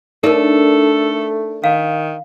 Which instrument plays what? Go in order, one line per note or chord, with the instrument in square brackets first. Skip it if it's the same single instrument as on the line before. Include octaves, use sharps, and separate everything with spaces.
[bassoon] A3 [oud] D4 [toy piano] D#4 A#4 [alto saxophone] A4
[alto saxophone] D#3 [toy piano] F5